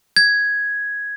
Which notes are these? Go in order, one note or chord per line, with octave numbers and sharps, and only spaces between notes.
G#6